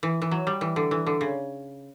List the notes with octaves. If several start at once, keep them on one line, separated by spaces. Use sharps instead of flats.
E3
E3
F#3
G3
E3
D3
E3
D3
C#3